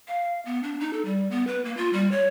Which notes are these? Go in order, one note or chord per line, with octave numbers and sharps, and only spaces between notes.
F5
B3
D4
D#4
A4
G3
B3
B4
A#3
F4
G3
C#5